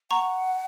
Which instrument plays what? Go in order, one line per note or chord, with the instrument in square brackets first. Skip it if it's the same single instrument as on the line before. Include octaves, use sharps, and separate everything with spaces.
[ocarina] F#5 [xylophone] A#5 C#6